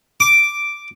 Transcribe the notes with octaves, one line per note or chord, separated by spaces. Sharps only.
D6